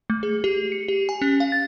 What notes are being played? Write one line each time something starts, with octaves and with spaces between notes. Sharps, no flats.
A3
G#4
G4
C#7
G4
G#5
C#4
F5
A6